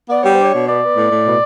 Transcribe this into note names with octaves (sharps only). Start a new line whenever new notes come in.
B3 D5
G3 C#5
C5
D4
C#5
B2
B3 D5
B3
A2
A2
B2